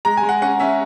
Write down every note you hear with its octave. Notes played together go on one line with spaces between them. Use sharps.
G#3 A#5
G#5
G#3
F#5
C#4 F#5
C#4 E5